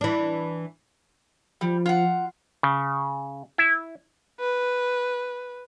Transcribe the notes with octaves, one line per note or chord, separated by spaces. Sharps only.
E3 D4
F3 G3
F4 F#5
C#3
E4
B4